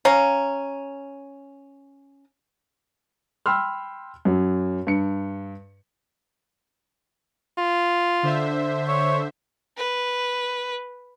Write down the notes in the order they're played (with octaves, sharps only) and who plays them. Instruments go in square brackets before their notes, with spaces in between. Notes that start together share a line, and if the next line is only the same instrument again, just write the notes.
[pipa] C#4 F5 A#5
[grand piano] G5 B5 C6 E6 F6
F#2 F#3
G2 C#7
[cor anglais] F4
[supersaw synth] D3 C5 E5
[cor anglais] C#5
[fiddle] B4